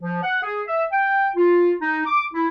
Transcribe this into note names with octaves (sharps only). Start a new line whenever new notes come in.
F3
F#5
G#4
E5
G5
F4
D#4
D6
E4